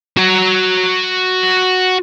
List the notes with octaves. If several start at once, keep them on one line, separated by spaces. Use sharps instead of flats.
F#4 A#5